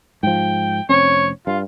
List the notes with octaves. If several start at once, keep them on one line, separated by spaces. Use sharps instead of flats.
G#2 F3 G5
F1 C4 C#4 C#5
G2 F4